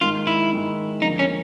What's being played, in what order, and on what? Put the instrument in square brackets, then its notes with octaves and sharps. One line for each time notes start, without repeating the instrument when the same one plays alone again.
[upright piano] G#2 D#3 G#3 [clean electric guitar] F4
[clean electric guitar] E4
[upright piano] G#2 D#3 G#3
[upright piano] F2 D3 F3 A#3 [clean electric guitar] D#4
[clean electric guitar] C#4